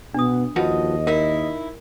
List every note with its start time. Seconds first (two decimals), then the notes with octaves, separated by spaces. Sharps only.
0.14 B2 B3 D4 D#6
0.56 D#2 F3 F#4 B4 D#5
1.07 D#4 E4 A#4